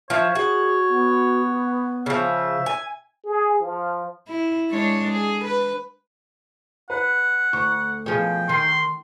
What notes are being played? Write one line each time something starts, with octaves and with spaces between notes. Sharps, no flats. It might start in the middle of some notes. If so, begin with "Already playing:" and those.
F3 C#5 E5
F#4 G#4
B3
C#3 F3 E5
G#5
G#4
F3
E4
G#3 D4 C#5
G#4
B4
B4 F#5
D2 C#6
B2 F3 G#4 C#5 G5
D#3 C6